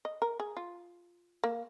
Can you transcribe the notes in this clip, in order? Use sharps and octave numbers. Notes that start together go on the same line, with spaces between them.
D#5
A#4
G#4
F4
A#3